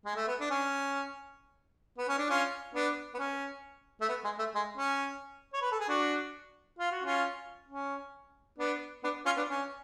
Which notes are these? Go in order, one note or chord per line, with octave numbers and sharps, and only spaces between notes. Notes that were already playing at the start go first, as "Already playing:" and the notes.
G#3
A3
B3
D4
C#4
B3
C#4
D4
C#4 F4
B3 D4
B3
C#4
A3
B3
G#3
A3
G#3
C#4
C#5
B4
A4
G#4
D4 F#4
F4
F#4
C#4 F4
C#4
B3 D4
B3 D4
C#4 F4
B3 D4
C#4